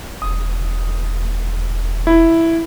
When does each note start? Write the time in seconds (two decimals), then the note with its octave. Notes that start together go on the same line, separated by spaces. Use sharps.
0.22 E1 D#6
2.07 E4